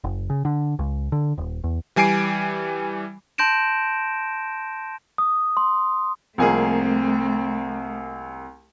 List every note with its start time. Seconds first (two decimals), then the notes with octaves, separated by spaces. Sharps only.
0.04 F#1
0.30 C#3
0.45 D3
0.79 C#2
1.12 D3
1.38 D#1
1.64 E2
1.96 E3 G3 G#5 C7 D7
3.38 A5 C6 G6 A#6 D7 E7
5.18 D#6
5.57 C6
6.38 C2 F3 A3 A#3 C4 G#4 G#5